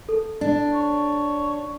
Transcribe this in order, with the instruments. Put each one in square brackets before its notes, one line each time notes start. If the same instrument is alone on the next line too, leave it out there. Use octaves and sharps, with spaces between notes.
[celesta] A4
[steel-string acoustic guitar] D4
[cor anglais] C#5